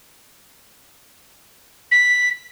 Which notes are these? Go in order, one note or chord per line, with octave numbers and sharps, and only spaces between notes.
B6